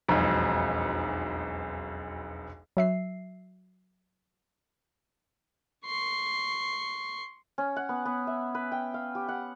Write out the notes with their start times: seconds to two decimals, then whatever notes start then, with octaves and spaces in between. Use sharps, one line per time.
0.08 E1 B1 F2
2.77 F#3 E5 C7
5.85 C6 C#6
7.58 C#4
7.76 F#5
7.89 B3
8.05 B3
8.27 E5
8.55 B4
8.72 G5
8.94 F5
9.15 G4
9.28 F#5